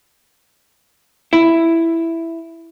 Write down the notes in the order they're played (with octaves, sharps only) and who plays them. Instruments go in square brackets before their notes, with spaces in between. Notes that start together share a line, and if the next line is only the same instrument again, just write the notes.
[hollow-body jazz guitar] E4